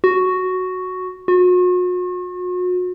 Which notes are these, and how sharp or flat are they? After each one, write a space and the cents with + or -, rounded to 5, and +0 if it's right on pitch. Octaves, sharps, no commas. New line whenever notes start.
F#4 +0
F#4 -40